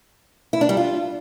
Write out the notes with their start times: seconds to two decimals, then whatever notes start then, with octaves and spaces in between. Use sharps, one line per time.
0.53 E4
0.61 D4
0.69 G3
0.77 F4